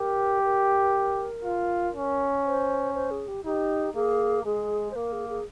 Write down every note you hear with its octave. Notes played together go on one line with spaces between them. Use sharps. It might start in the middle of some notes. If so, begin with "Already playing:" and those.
Already playing: G4 A#4
A#4
F4
C#4
C5
C5
G#4
G4
D#4 G4
A#3 G#4
G#3 G#4
C5
A#3 A#4
G#4
G#4